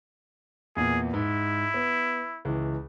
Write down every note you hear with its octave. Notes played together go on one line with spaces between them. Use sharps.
E2 A#2 G#4
G#2 E4
B3
C#2 E3